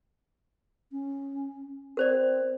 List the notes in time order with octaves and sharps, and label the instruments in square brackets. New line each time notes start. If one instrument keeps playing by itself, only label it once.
[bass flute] C#4
[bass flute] C4 [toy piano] A#4 C5 D5